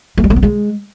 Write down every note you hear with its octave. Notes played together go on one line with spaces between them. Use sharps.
A3
G3
A3
B3
G#3